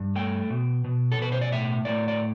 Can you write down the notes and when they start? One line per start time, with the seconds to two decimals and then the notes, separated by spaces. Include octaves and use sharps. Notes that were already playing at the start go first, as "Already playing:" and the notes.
Already playing: G2
0.16 A3 G5
0.50 B2
0.84 B2
1.12 A4
1.18 B2 B4
1.32 C5
1.41 D5
1.52 A2 E5
1.85 A2 D5
2.08 D5